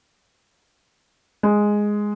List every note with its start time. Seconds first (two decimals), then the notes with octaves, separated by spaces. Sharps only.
1.43 G#3